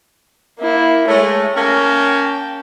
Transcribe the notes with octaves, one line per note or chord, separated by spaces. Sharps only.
A#3 E4
G#3 A3 C#5
A#3 C#4 G5 A5